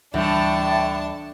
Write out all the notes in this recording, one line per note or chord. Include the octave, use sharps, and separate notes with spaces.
D2 A2 D3 E3 G3 D4 E5 A5